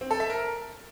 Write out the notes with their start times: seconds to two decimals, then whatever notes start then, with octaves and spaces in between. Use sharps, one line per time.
0.01 C4
0.11 A4
0.20 E5
0.30 A#4